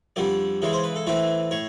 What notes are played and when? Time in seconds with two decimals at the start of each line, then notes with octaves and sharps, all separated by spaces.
0.16 F2 D3 G3 D5
0.62 C#3 E3 G#3
0.73 C5
0.84 B4
0.96 A4
1.07 A2 E3 A3 C4 B4
1.51 A2 C#5